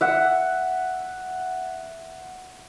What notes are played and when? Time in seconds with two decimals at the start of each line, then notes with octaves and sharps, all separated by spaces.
0.01 E5 F#5